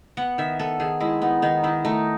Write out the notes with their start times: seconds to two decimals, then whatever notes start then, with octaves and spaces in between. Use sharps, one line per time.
0.17 B3 F#5
0.38 D#3 E5
0.59 B3 A4
0.80 D#3 G#4
1.00 G#3 E4
1.22 B3 D#4
1.42 D#3 D#4
1.64 D#3 E4
1.85 A3 D#4